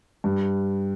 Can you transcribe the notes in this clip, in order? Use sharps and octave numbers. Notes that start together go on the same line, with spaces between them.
G2